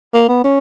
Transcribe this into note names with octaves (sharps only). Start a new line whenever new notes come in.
A#3
B3
C#4